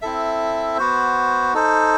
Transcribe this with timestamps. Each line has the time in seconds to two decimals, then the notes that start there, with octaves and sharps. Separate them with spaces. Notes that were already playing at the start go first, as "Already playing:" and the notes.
0.02 C4 E4 A4 E5
0.77 B3 F#4 C5
1.54 D#4 A4 C5